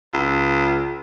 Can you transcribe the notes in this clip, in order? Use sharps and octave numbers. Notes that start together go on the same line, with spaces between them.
C#2